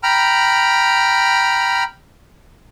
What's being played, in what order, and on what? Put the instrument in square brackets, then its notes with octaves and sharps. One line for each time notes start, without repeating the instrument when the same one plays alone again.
[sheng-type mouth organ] G5 A#5 B5 F6